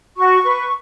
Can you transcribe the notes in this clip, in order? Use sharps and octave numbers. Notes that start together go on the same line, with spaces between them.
F#4 C#6
B4